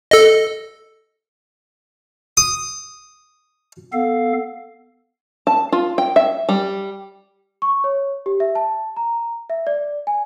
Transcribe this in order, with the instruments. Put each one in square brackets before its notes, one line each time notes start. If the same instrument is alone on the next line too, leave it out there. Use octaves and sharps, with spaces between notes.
[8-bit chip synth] A4 D#5
[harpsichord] D#6
[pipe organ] B3 A4 F5
[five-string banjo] A5
F4
G5
E5
G3
[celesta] C#6
C#5
G4
E5
A5
A#5
E5
D5
G#5